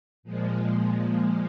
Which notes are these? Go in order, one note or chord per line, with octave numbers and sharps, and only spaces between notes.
A#2 F3 G#3